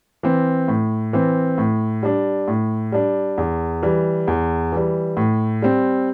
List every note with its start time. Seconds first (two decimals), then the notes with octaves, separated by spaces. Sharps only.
0.23 E3 C4
0.68 A2
1.13 E3 C4
1.58 A2
2.03 G3 D4
2.48 A2
2.92 G3 D4
3.38 E2
3.83 E3 G3
4.27 E2
4.72 E3 G3
5.17 A2
5.62 G3 C4